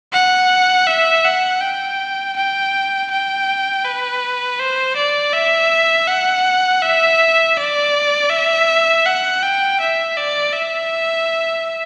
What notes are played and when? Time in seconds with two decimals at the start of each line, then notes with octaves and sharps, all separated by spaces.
0.13 F#5
0.87 E5
1.25 F#5
1.61 G5
2.37 G5
3.11 G5
3.85 B4
4.60 C5
4.96 D5
5.33 E5
6.08 F#5
6.82 E5
7.57 D5
8.30 E5
9.06 F#5
9.42 G5
9.80 E5
10.17 D5
10.53 E5